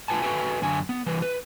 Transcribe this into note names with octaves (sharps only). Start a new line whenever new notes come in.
A3 F4 B4 G#5 A5
F#4 A4 B4 E5 G5 G#5
F#2 D3 G#5
B3
E3 G3 B4
B4